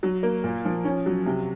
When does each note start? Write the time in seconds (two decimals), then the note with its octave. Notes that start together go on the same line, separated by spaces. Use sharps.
0.03 F#3
0.23 A#3
0.44 A#2
0.65 F3
0.85 C#4
1.06 F#3
1.26 C3